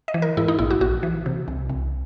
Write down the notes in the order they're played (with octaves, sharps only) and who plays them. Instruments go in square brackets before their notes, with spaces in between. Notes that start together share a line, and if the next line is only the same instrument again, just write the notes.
[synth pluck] D#5
E3
A#4
G#2 E4
D#4
A#1 E4
F#4
A#1 F#4
E3
C3
C2
C2